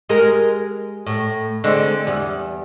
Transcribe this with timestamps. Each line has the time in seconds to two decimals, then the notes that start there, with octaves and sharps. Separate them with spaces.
0.09 G#3 G4 A#4
1.06 A2
1.64 D3 G#3 C4
2.07 E2 G3